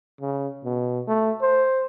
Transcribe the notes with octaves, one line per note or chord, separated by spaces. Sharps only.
C#3
B2
A3
C5